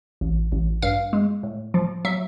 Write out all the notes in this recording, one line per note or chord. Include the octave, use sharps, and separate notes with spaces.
A1
A1
G2 F5
G#3
A2
F3
F#3 E5